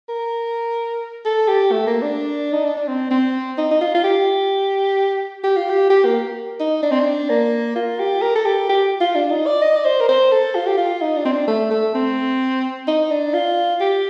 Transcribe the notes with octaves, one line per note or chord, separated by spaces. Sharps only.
A#4
A4
G4
A3
A#3
D4
D#4
D4
D4
C4
C4
D#4
D#4
F4
F4
G4
G4
F4
G4
G4
A#3
D#4
D4
C4
D4
A#3
F4
G4
A#4
A4
G4
G4
F4
D4
D#4
D5
D#5
D5
C5
A#4
C5
A4
F4
G4
F4
D#4
D4
C4
D4
A3
A3
C4
D#4
D4
F4
G4